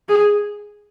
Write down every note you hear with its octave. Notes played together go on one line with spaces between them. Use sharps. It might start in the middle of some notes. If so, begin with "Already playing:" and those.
G#4